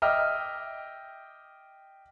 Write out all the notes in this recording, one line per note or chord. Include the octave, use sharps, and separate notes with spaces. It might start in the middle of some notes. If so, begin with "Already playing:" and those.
D#5 E5 G5 D6 F6